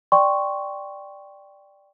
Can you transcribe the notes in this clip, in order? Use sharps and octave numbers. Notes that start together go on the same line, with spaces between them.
D5 G5 C6 C#6